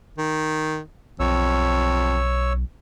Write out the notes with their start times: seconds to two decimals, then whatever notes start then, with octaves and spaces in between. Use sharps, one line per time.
0.18 D#3
1.20 B1 F2 C#5 E6